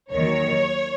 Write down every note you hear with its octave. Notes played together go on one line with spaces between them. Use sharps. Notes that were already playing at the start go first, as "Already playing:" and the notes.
D#2 D#3 F#3 C#5